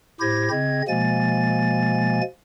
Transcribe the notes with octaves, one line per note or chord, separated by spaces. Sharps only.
A2 E4 G4 C5 G#6 A#6
C#3 C4 D#5 G#6
B2 F3 G#3 A#3 G#5 A6